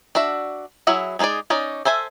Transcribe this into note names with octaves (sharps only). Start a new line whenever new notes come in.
D4 F#4 E5
F#3 E4 G#4 E5 F#5
G#3 D#4 E4 G#4 D5
C#4 D#4 D5
A4 C5 E5 G#5